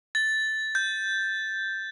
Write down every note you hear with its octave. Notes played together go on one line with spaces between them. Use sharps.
A6
G6